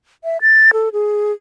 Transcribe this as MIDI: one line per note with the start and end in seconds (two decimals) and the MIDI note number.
0.24 0.37 76
0.41 0.71 93
0.73 0.89 69
0.93 1.32 68